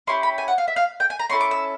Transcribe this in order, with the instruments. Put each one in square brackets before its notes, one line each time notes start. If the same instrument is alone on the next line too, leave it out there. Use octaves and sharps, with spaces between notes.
[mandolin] C#4 E4 G4 C6
B5
G#5
F#5
F5
E5
F5
G5
G#5
A#5
C#4 E4 A4 C6
D6
E6